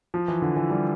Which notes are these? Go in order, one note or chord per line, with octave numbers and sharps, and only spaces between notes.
F3
E3
D3
E3
G3